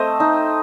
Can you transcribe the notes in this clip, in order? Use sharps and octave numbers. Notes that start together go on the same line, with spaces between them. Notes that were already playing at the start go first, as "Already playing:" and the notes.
Already playing: A3 C4 C5 D#5
D#4